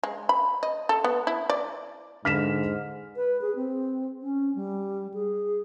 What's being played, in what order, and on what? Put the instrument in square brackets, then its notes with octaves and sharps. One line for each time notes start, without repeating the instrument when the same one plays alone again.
[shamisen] G#3
B5
D#5
A4
B3
E4
D5
[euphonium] G#2 [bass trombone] D3 [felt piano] F6 B6 E7
[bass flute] B4
G#4
C4
C#4
G3
G#4